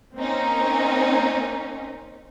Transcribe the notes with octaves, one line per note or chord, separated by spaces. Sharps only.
A#3 C4 C#4 D#4